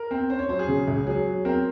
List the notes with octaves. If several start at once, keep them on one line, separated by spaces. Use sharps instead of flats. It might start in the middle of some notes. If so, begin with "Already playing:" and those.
Already playing: A#4
C4
C#4 C5
C#5
F#3 C5
G#4
C#3
C#2
F#3 G#4
F#3
C4 A#4